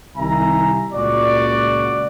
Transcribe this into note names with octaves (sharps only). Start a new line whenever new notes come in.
C2 D#3 E5 G#5 A#5
C#2 A#2 F#4 D5